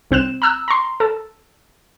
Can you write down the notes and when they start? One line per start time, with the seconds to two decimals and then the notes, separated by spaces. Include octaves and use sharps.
0.11 C2 C4 F#6 E7
0.42 A#5 E6 F#6
0.68 A#5 C6
1.00 A4